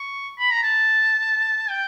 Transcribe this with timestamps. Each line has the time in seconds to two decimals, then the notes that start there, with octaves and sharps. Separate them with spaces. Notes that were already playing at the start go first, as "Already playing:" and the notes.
Already playing: C#6
0.39 B5
0.51 A#5
0.63 A5
1.70 G5